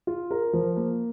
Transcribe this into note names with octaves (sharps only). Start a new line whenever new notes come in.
F4
A#4
F3
A#3